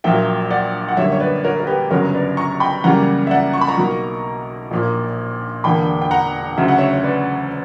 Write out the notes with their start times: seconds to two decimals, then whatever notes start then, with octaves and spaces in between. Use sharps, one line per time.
0.04 A#1 A#2 F#3 A#3 E5 G5
0.51 D5 F#5
0.89 F#5
0.97 F#2 D3 G3 A#3 C#5 E5
1.12 C#5
1.20 B4 D5
1.44 A#4 C#5
1.60 A#4
1.67 G4 B4
1.91 G1 F#2 C#3 F#3 B3 A#4 C#5
2.13 B4 D5
2.37 A#5 C#6
2.60 G5 B5
2.84 F#2 C#3 E3 G3 A#3 F#5 A#5
3.27 E5
3.30 D5 F#5
3.53 C#6
3.61 B5
3.68 A#5 C#6
3.77 B1 B2 A#3
4.71 A#1 A#2 A#3
5.64 E1 E2 D3 A#3 G5 B5
6.02 G5
6.11 F#5 A#5
6.57 D2 C#3 F#3 E5
6.68 F#5
6.78 C#5 E5
6.93 C#5
7.04 B4 D5